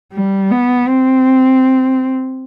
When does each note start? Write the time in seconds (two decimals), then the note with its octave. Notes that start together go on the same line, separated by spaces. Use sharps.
0.12 G3
0.51 B3
0.88 C4